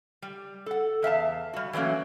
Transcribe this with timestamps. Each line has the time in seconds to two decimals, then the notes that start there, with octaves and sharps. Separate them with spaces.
0.22 G3
0.66 A4 F#5
1.02 E2 E5 F5 A5
1.53 G3 F#4
1.73 E3 F#3 A3 A#3 C#4